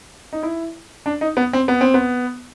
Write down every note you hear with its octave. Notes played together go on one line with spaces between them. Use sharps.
D#4
E4
D4
D#4
B3
C4
B3
C4
B3